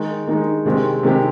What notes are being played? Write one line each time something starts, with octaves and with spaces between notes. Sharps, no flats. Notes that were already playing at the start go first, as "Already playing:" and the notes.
Already playing: D#3 G#3 D#4
D#3 G#3 D#4
C3 D#3 G#3 C4 G4
C3 D#3 G#3 C4 G4